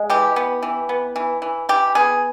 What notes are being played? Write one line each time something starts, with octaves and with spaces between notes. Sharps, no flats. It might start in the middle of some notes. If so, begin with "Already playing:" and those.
Already playing: G#3
E3 G4
B3
E3
B3
E3
E3
E3 G4
B3 G#4